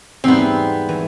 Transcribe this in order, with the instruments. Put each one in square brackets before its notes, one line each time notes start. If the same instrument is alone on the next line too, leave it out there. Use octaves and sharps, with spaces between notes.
[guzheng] E2 G#2 G3 [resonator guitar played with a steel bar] B3 C4
[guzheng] E3